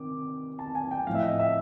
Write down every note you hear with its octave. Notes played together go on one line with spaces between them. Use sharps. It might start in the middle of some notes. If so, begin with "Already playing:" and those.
Already playing: C3 D#3 D6
A5
G#5
G5
A2 F3 F5
E5
D#5
E5